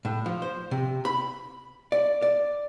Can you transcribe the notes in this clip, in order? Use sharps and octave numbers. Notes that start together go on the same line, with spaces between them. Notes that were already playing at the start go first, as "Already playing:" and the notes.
A2
F3
C5
C3
B5
D5
D5